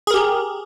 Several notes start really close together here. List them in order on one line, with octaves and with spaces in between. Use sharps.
G#4 A#4 G4